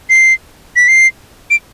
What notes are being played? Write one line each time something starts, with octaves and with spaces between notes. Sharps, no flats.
C7
B6
C7
D7